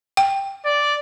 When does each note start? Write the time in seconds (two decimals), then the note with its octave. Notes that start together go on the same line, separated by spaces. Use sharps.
0.17 G5
0.65 D5